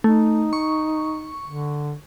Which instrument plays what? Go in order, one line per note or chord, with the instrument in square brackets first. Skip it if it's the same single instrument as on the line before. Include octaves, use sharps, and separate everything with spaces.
[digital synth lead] A3 [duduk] D#4
[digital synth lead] C#6
[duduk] D3